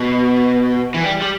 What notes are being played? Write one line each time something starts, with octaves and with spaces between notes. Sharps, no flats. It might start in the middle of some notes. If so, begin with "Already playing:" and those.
Already playing: B2
E3
G3
G3